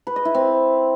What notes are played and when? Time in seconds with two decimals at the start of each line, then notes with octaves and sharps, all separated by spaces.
0.07 B4
0.16 D#5
0.25 E4
0.35 C4